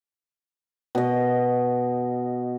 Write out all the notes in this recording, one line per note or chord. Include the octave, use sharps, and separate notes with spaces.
B2 D#5